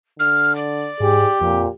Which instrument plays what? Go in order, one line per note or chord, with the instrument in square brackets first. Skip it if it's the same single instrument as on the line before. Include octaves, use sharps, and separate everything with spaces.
[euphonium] D3 [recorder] F6
[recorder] D5
[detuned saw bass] G#2 [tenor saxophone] G4 [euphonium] G#4
[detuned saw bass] F2 [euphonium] A#2